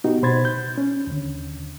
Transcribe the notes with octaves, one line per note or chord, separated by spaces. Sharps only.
B3 D#4 F#4 G4
B2 C5 B5 C6 G#6 A6
G6
C#4
D#2 D3